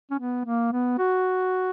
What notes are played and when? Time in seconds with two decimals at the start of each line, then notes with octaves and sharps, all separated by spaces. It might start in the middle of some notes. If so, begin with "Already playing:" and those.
0.11 C#4
0.19 B3
0.45 A#3
0.72 B3
0.98 F#4